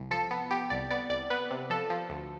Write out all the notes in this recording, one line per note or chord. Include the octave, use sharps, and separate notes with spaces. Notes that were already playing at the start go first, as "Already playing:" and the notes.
Already playing: C2
F3 A4
B3
B3 G4
C2 D5
B3 D5
C2 D5
B3 B4
C3
F3 A4
F3
D2